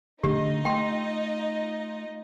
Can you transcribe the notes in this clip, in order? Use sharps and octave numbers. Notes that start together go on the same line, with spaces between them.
D3 A3 D4 D#4 F4 G4 D#5
A3 G5 C6